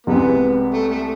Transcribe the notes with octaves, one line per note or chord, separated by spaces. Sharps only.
C2 C3 G#3 B3
A3
A3